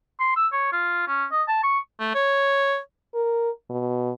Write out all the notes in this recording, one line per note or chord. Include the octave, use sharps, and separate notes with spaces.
C6
E6
C#5
F4
C#4
D#5
A5
C#6
A3
C#5
A#4
B2